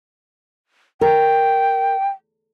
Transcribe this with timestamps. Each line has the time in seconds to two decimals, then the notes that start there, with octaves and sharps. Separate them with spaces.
1.01 A#4 G5